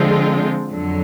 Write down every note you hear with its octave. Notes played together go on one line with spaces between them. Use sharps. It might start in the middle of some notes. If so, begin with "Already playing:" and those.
Already playing: D3 F3 G#3 C4 F4
F2 D3 F#3